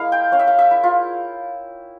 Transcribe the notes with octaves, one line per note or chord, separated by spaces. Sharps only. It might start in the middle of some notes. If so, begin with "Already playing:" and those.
Already playing: G#3 A#3 E4 F5
G5
C#4 F5
E5
F5
E5
E4
F4